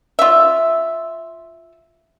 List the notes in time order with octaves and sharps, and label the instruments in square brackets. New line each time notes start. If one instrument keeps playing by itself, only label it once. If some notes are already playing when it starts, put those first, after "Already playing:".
[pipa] F4 E5